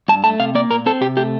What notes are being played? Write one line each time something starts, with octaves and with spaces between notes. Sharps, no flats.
G2 A5
A3 A5
C3 F5
A#3 D5
A#2 A#4
C4 A4
C3 G4
A3 G4